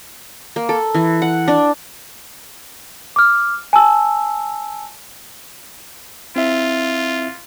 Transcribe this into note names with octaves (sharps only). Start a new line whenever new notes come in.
A#3
A4
E3
F#5
D4
D6 F6
G#5 A5 E6
C4 E4 F4 E5